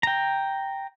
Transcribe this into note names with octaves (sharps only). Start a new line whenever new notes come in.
G5 A#5